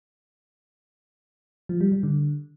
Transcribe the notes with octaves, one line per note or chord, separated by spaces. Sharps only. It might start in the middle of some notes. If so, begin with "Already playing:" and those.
F3
G3
G3
D3